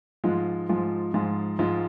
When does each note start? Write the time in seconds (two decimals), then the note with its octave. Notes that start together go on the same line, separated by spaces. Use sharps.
0.24 G#2 F3 G#3 F4
0.69 G#2 F3 G#3 F4
1.14 G#2 F3 G#3 F4
1.59 G#2 F3 G#3 F4